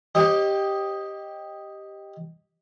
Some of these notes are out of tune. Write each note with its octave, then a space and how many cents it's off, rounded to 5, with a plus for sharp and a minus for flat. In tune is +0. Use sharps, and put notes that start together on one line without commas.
G4 +0 C5 +45 D#5 +0